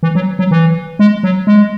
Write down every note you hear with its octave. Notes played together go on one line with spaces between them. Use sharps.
E3
F#3
F#3
E3
G#3
F#3
G#3